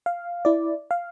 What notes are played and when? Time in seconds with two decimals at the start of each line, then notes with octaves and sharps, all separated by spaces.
0.06 F5
0.45 E4 D5
0.91 F5